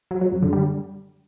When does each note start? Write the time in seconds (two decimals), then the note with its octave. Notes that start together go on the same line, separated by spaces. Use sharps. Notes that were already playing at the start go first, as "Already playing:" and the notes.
0.11 F#3
0.21 F#3
0.32 F#2
0.42 D3
0.53 G3